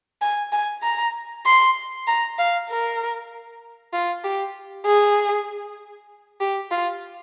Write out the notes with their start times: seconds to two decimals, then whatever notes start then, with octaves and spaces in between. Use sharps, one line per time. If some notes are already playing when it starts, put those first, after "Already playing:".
0.21 G#5
0.52 G#5
0.83 A#5
1.46 C6
2.07 A#5
2.38 F5
2.69 A#4
3.93 F4
4.24 G4
4.85 G#4
6.40 G4
6.71 F4